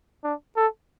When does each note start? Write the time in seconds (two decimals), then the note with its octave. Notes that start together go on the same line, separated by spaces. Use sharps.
0.24 D4
0.57 A4